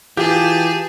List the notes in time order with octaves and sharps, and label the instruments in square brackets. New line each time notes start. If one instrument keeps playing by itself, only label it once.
[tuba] E3 [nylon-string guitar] F4 [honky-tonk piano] G4 [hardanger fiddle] G#4 A5